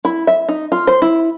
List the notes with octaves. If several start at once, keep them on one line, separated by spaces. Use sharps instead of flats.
E4
E5
D#4
F4
C5
E4